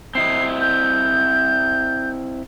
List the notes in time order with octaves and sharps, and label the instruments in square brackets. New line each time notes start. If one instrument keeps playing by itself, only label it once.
[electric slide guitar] C4 E4 D#5 [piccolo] C7
[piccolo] G6